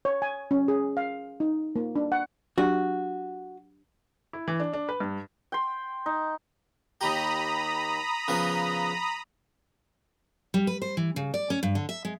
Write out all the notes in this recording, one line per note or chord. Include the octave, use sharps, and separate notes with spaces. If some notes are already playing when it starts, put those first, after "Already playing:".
C#5
G#5
C#4
G#4
F5
D#4
A#3
D4
F#5
F#3 D4 F#4 G4
E4
E3
D4
D4
B4
G2
G5 C6
D#4
D#2 G4 A#5 B5 D#6
C#3 F3 B3
G3
B4
C5
E3
C#3
D5
C#4
G2
D3
E5
G#3